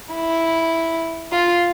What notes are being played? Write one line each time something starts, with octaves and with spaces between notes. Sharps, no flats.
E4
F4